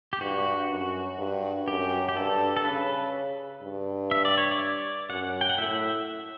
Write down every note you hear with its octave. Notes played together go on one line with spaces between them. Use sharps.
G4
G2 F#4
F#2
G2
F#2 G4
G4
G2 A4
A4
C#3 B4
G2
E5
D5
C#5
D5
F#2 F#5
G5
F#5
A2 E5